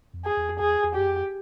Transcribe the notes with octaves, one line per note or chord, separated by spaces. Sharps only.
F2
G#4
E2
F2
E2 G#4
E2
F#2 G4
F2